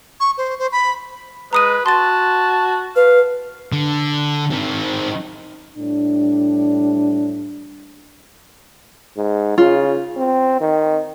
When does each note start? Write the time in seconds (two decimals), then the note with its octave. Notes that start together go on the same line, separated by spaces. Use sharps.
0.20 C#6
0.38 C5
0.59 C5
0.72 B5
1.53 G#3 B4 A#5 D#6 D#7
1.86 F#4 A5 C6 A6
2.96 B4 F5
3.72 D3
4.52 D#3 C4
5.78 A2 G3 D4
9.16 G#2
9.58 C#3 F4
10.16 C4
10.60 D#3